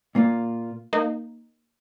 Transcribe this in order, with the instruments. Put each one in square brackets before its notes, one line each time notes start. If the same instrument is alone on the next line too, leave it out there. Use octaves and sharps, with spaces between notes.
[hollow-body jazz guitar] A#2 A#3 F4
[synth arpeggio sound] A#3 D#4